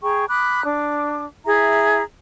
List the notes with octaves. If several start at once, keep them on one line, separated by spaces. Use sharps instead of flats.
G#4 G5 A#5 C#6
B5 D6 D#6 F#6
D4 D6
E4 G#4 E5 A#5